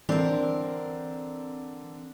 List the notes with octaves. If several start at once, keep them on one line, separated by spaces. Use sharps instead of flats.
D3 E3 C4 D4 A#4